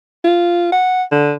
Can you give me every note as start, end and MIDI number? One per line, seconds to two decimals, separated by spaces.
0.24 0.71 65
0.72 1.03 78
1.12 1.33 50